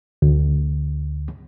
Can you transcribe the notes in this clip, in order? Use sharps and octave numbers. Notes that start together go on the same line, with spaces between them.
D2